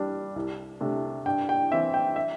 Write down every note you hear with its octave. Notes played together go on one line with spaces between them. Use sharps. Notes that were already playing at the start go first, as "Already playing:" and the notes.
Already playing: G2 G3 D4
C2
C3 A3 D4
G2 G5
G5
E3 C4 E5
G5
E5